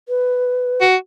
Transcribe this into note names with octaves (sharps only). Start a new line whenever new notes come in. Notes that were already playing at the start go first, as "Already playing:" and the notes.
B4
F#4